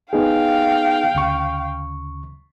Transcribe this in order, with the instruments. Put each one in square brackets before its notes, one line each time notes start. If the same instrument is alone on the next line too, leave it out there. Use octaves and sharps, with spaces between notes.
[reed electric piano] B3 D#4 G#4 [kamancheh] F5 G5
[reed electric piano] D2 C#3 C#6